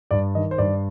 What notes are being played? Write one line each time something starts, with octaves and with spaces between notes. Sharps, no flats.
G2 D5
D#3 D#5
C5
G2 D5